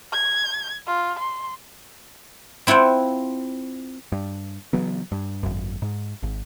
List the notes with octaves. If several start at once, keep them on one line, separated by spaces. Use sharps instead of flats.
G#6
F4
C6
C4 E4 F4 F#5 G5
G2
C#3 E3 F#3 B3
G2
G#1 F#2
G#2
G#1